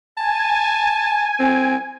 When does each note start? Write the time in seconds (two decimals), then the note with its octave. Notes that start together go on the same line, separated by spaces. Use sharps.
0.17 G#5 A5
1.40 C4